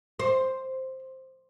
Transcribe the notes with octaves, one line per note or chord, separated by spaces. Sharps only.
C5